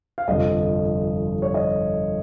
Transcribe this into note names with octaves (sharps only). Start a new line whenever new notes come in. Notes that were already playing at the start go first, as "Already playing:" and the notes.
F5
G1 F2 C3 F3 D#5
C#5
D#5